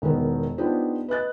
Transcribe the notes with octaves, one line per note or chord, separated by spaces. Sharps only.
E1 D#3 B3 A#4
B3 D4 D#4 F4 G4 C5
B4 D#5 F#6 A6